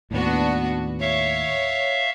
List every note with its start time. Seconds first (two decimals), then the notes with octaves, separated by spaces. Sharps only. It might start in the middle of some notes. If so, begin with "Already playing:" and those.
0.11 D#2 A2 B3 D4 F#4
1.01 C#5 E5 F5